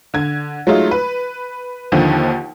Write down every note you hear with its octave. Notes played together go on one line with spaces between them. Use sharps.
D3 G#6
F#3 G#3 A3 D#4 F4
B4
D#2 D3 D#3 F3